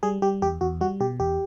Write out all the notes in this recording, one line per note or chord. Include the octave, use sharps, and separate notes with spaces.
G3 G#4
G3 G4
E2 G4
E2 F#4
G3 F#4
B2 G4
E2 G4